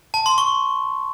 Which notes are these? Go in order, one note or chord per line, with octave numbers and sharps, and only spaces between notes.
A5
C6
C#6